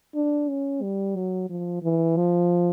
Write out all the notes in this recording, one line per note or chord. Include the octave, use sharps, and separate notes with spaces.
D4
C#4
G3
F#3
F3
E3
F3